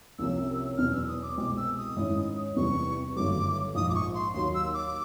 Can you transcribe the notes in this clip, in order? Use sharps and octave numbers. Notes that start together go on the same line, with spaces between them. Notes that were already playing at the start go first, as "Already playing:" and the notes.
C2 C3 F3 A#3 C#4 E6
E2 B2 F#3 F6
E6
D#6
D6
C2 B2 G#3 C4 D6
E6
D#6
G#2 D#3 G#3 C#4 E4
E2 C3 E3 G3 B3 C#6
G1 G2 D#3 F#3 A3 D6
A#1 G#2 F3 D#6
D6
C#6
C6
D#2 D#3 F#3 C6
E6
D6